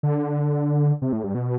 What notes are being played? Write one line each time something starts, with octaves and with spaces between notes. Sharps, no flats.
D3
C3
A2
G2
B2